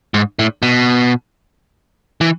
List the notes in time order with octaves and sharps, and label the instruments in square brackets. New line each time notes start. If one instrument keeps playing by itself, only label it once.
[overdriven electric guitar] G#2
A2
B2
E3